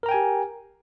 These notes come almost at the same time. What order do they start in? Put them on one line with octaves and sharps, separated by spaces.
A#4 A#5 G5 G#5 G4